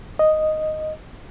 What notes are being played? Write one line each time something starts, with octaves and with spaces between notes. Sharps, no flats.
D#5